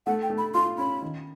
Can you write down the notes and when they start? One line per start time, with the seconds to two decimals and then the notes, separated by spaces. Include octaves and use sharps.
0.06 A3 F#5
0.22 G5
0.30 A3
0.38 B5
0.54 F4 C6
0.78 C#4 B5
1.02 D#3